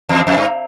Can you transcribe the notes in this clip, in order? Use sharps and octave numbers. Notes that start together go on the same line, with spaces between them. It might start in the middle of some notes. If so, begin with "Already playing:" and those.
E2
F2
G2